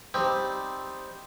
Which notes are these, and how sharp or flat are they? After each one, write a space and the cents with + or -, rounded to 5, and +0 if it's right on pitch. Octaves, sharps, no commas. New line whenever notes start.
G3 +0 C4 +0 D#4 +0